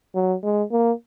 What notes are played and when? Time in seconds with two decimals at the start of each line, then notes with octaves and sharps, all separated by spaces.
0.15 F#3
0.43 G#3
0.71 A#3